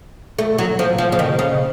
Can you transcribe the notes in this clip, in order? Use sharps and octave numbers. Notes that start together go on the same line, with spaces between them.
A3
F#3
F3
F3
C#3
D#3
C#3